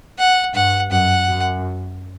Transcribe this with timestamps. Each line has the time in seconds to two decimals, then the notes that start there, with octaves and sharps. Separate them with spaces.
0.19 F#5
0.54 G2 F#5
0.91 F#2 F#5
1.28 F#2